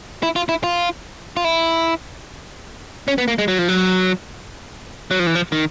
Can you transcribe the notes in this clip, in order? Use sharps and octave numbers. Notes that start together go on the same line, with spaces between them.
E4
F4
E4
F4
F4
E4
C#4
B3
A#3
G#3
F#3
F3
F#3
F#3
F3
E3
F3
D#3